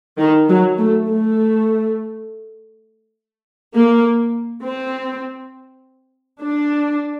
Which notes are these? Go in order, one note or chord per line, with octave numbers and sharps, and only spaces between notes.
D#3
F#3
A3
A3
A#3
C4
D4